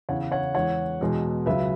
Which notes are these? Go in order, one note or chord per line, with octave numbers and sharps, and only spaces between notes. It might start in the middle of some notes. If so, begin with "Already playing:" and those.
E2 C#3 E3 C#5 F#5
C#5 F#5
E2 E3 G#3 C#5 F#5
E2 B2 G#3
C#2 C#3 F#3 B4 E5